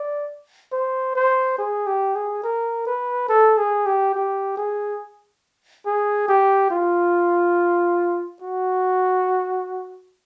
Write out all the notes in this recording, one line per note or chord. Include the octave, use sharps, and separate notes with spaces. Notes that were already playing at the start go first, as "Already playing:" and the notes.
Already playing: D5
C5
C5
G#4
G4
G#4
A#4
B4
A4
G#4
G4
G4
G#4
G#4
G4
F4
F#4